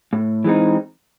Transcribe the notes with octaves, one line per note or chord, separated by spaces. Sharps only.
A2
E3 G#3 C4 D#4